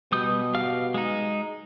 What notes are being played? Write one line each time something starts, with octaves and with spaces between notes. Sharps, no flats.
B2 G3 D#6 G6
G4 F5 F6
G#3 D#4